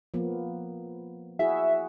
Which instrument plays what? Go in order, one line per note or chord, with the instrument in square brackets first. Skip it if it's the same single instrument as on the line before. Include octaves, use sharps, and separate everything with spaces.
[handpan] F3 A#3 B3
[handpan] E4 F#4 G#4 [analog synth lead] E5